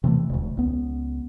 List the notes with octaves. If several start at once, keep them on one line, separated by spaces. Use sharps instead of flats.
C3 E3 G#3 A3
E1 D2
C#2 B3